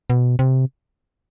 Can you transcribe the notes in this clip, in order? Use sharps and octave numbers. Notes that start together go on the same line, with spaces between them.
B2
C3